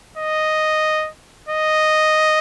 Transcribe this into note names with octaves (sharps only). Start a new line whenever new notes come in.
D#5
D#5